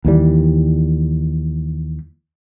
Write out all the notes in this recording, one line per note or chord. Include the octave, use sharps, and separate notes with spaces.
D#2 E3 G3